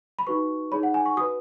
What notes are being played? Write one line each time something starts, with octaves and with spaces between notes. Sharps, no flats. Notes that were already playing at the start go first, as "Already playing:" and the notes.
B5
D#4 F#4 B4 C#6
D#4 G#4 C#5 B5
F#5
G#5
C#6
F#4 B4 D#6